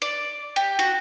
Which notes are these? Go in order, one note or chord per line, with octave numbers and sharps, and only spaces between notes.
D5
G4
F#4